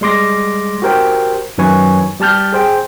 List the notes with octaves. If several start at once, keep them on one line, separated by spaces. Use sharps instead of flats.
G3 G#3 C6 D6 A#6
F#4 G4 A#4 C5 G5
F#2 D#3 F#3 B4 G#5 C#6
G3 G4 A5 F6 G6
G#4 C5 G5